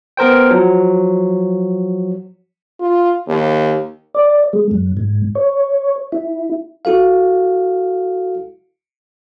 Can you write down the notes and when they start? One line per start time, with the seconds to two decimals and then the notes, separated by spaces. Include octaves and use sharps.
0.17 B3 A#4 C5 G5
0.50 F3 F#3
2.80 F4
3.28 D#2
4.15 D5
4.53 G#3
4.71 F#2
4.97 G#2
5.35 C#5
6.12 E4
6.85 E4 F#4 A4 F5